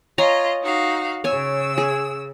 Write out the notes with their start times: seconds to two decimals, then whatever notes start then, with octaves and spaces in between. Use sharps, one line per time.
0.18 F4 C#5 D#5 G#5 A#5
0.61 D#4 F#4 F5
1.24 C#3 C#5 G#5 E6
1.78 G#4